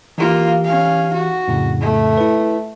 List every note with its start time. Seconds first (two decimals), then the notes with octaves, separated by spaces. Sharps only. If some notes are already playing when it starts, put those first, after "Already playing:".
0.18 E3 A#3 F4 G4
0.64 C#4 F5
1.14 F#4
1.48 F2 A2 C#3
1.81 A3
2.17 E4 B4